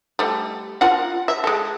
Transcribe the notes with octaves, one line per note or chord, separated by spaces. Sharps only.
G3 A3
F4 A#4 F#5
E5
G#3 A4